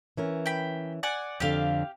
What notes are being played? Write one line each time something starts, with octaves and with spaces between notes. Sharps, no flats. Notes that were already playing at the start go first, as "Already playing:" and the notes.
E3 C#4 A#4
G5 B5
D5 F#5 G#5
F2 D3 G4 F5